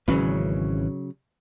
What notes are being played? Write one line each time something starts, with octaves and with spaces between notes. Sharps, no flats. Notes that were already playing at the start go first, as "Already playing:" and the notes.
G#1 C#3 E3 F#3 C#4 B4